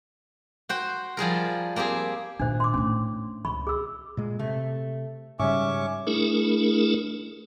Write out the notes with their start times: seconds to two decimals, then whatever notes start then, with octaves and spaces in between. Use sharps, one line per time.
0.69 F#4 C5 G5
1.17 F3 G3 G#4 A#4
1.76 A#3 C4 G4 G#4
2.39 A#2 D#3 D4 C5
2.60 C6 D6
2.74 A2 A3 C#4
3.45 C#2 C#3 B5 C#6
3.67 G#4 E6
4.17 A#2 G#3
4.39 C3 A3
5.39 G#2 C#3 G3 C#4 E5 C#6 D6
6.07 A3 D4 E4 G#4 A#4